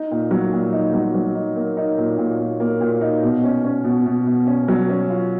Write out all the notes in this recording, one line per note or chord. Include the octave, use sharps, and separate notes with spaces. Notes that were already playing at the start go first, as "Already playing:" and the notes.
Already playing: D#4
A#2
F#3
A#2
D#4
F#3
F#3
D#4
A#3
D#4
A#2
A#2
A#2
A#3
A#2
D#4
B2
C#4
C#4
B2
B2
B2
C#4
F#3
C#4
F4